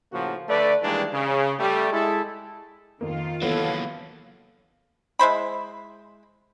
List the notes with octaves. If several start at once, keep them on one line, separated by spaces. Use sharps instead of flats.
A2 C#3 F3 A#3 F#4
D3 A3 B4 D5
D#3 E3 G3 G#3 A#3 D4
C#3
G3 A3
G#3 E4 A4
F2 D#3 A#3 F4
E3 F#3 A#3 B3 A4 C#5 F5
G#3 E4 C5 B5